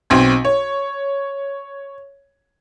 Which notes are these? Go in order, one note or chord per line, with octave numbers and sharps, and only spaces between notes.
B1 C4 C6 G#6
C#5